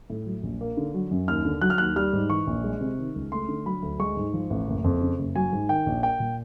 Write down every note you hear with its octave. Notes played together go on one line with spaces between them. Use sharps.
A2
F#3
A#1
A#3
D3
F#3
F#2
D#2 F6
D3
F#3 F#6
F6
D#2 F#6
G3 F6
G#2
E3 C#6
A#1
G#3
C3
D#3
C#2
A3 C6
D3
F#3 B5
D2
G#3 C#6
G#2
F3
A1
F#1
F2
C#3
F#1
F#3 G#5
G#2
D#3 G5
A#1
A#3 G5
A#2